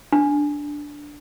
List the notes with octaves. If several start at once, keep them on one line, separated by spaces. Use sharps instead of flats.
D4